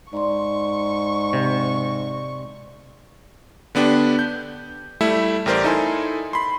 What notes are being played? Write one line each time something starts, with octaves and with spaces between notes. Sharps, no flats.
G#2 D5 C6 C#6
C3
D3 B3 D4 G4
G6
G3 A3 E4 E5
A1 G4 A#4 C5 D5
D#4 E4 A4 G#5 C6
B5 C6